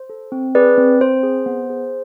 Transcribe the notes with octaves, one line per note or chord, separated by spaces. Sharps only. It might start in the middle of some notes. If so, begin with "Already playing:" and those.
Already playing: C5
A4
C4
G#4 B4 D5
C4
C4 C5
G#4
B3
G#4